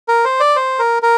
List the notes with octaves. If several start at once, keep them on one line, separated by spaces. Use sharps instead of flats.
A#4
C5
D5
C5
A#4
A#4